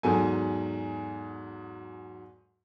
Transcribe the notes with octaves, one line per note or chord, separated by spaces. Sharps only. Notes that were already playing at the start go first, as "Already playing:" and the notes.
E2 G#2 F#3 A4 G#5